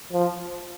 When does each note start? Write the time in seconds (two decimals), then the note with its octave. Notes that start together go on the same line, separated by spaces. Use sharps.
0.12 F3